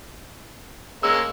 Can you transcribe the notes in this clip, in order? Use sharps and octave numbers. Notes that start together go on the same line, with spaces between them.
G#3 A#3 C#4 E6